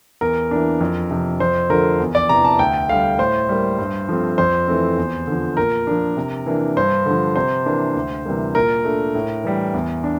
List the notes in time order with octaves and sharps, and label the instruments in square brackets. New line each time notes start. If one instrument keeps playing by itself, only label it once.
[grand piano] E2 A#4
E3 A#3 D4
F2
C3 F3
F2 C5
D3 F3 A3 A#4
E2
D5
C3 E3 A#5
A5
D2 G5
D3 G3 F5
A2 C5
G3 A#3
G2
F3 A3 C4
F2 C5
E3 A3 C4
E2
D3 F3
A#2 A#4
F3 A#3 D4
C3
E3 A#3 D4
G2 C5
D3 F3
C3 C5
E3 A#3 D4
D2
C3 E3 G3 A#3
A#2 A#4
A3 D4
A2
E3 G3
E2
D4